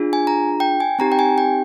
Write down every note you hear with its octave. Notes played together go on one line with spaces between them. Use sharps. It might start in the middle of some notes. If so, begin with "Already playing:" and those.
Already playing: D4 F4 G#4
G#5
A#5
G5
G#5
C4 D#4 G4 A#5
G5
G#5
G5